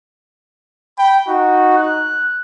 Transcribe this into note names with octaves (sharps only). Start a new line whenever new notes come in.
G5 B5
D#4 F#4
F#6